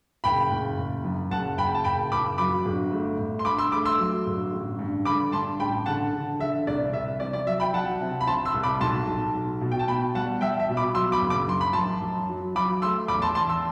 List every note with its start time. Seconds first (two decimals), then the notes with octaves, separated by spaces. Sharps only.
0.24 F#1 G5 B5
0.51 F#1
0.78 F#1
1.04 F#2
1.31 F#1 F#5 A5
1.58 F#1 G5 B5
1.74 A5
1.84 F#1 G5 B5
2.12 F#1 B5 D6
2.38 F#3 B5 D6
2.65 G1
2.92 A3
3.18 G1
3.39 C6
3.45 G2 B5 D6
3.58 C6 E6
3.72 A3 B5 D6
3.85 C6 E6
3.99 F#3
4.26 G1
4.53 A1
4.79 G2
5.05 D3 B5 D6
5.32 G2 A5 C6
5.59 A1 G5 B5
5.86 D3 F#5 A5
6.13 D3
6.39 D3 E5
6.67 C2 D5
6.93 C2 E5
7.20 C3 D5
7.33 D5
7.46 F#3 E5
7.60 G5 B5
7.74 F#3 F#5 A5
8.01 C3
8.21 B5
8.27 C3 A5 C6
8.45 C6 E6
8.54 C2
8.63 B5 D6
8.81 B1 A5 C6
9.07 B1
9.35 B1
9.61 B2
9.72 G5
9.79 A5
9.88 B2 G5 B5
10.15 G3 F#5 A5
10.41 G3 E5 G5
10.60 E5
10.69 B2
10.77 B5 D6
10.95 F#3 C6 E6
11.12 B5 D6
11.21 F#1
11.30 B5 D6
11.48 F#2 C6
11.61 B5
11.73 F#2 A5 C6
12.02 F#2
12.29 F#3
12.55 F#3 B5 D6
12.82 A3 C6 E6
13.08 E2 B5 D6
13.22 A5 C6
13.35 E2 A5 C6
13.49 C6 E6